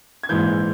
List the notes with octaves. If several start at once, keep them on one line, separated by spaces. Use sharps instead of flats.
G#6
A#1 G#2 E3 G6